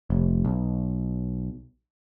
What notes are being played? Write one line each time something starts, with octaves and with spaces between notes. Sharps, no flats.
F1
B1